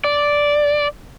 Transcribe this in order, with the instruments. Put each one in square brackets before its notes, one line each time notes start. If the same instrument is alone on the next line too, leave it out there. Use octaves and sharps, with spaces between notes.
[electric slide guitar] D5